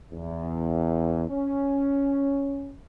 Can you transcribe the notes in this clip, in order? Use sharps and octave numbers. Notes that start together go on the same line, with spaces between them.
E2
C#4